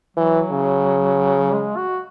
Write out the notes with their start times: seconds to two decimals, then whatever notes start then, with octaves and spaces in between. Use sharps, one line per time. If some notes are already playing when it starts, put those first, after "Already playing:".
0.17 E3 F#3
0.51 C#3
1.54 G#3
1.76 F#4